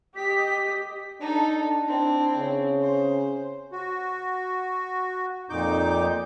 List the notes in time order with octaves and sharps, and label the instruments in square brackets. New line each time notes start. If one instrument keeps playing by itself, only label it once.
[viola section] G4 D#5 [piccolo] B6
[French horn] D4 [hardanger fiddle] D#4 A4
[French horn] D4
[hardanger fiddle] C4 E4 [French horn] D4
[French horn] C#3
[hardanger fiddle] C5
[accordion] F#4
F2 A#2 D#4 D6 G6